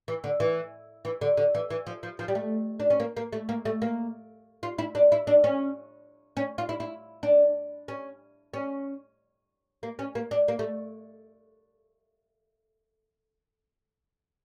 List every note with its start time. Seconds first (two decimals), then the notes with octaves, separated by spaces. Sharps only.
0.08 E3
0.24 D3
0.40 E3
1.05 E3
1.21 D3
1.37 D3
1.55 E3
1.70 E3
1.87 F3
2.03 F3
2.19 F3
2.28 G3
2.35 A3
2.80 D4
2.90 C#4
3.00 A#3
3.17 A#3
3.32 A3
3.49 A#3
3.65 A3
3.82 A#3
4.63 F4
4.78 E4
4.95 D4
5.12 E4
5.27 D4
5.44 C#4
6.37 C#4
6.58 F4
6.69 E4
6.80 E4
7.23 D4
7.88 C#4
8.54 C#4
9.83 A#3
9.99 C#4
10.15 A#3
10.31 D4
10.48 A#3
10.59 A3